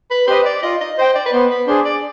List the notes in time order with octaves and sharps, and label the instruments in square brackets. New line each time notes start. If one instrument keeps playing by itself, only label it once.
[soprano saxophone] B4
[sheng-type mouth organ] G4 B4 D#5 [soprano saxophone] C5
[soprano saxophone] D5
[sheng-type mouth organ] F4 [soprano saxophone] D#5
[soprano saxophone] D#5
[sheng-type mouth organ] C5 G5 [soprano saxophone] D#5
[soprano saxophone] D5
B4
[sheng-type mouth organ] B3 [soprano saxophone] C5
[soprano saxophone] B4
[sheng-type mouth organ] D4 G#4 [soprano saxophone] C5
[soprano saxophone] D5